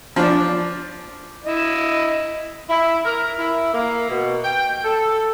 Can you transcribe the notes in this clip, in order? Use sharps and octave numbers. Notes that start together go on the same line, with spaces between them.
F3 D4
E4 D#5
E4
A#4
E4
A#3
B2
G5
A4